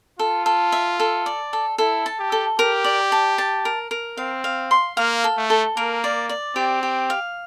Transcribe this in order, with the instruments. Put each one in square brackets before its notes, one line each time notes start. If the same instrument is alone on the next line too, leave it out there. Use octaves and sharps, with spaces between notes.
[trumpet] F4 [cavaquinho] A4
[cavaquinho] A4
E5
A4
D5
A4
[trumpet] E4 [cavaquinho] A4
[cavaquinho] A5
[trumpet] G4
[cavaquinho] A4
[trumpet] G4 [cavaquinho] A#4
[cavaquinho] D5
A5
A5
A#4
A#4
[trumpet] C4 [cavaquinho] F5
[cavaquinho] F5
C6
[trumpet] A#3 [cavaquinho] F5
[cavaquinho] A4
[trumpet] A3
[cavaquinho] A4
[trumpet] A#3 [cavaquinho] A#4
[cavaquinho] D5
D5
[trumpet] C4 [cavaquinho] G4
[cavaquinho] G4
F5